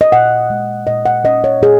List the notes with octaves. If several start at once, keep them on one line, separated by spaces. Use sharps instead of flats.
D#5
A#2 F#5
G#3
A#2 D#5
F#5
C#4 D#5
C#5
A#2 G#4